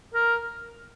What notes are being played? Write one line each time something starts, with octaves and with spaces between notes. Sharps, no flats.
A#4